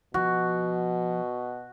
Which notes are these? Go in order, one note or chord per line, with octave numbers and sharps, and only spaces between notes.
B2 F3 F#4